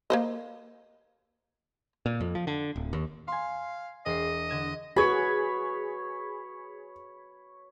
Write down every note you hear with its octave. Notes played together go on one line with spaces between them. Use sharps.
A#3 C5 D#5
A#2
F2
F3
D3
D1
D#2
F5 G#5 C6
E1 D#5 C7
D3 G#6 E7
F#4 G#4 B4 C#5 B5